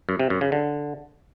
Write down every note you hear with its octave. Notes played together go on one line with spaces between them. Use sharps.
F#2
C3
F#2
C#3
D3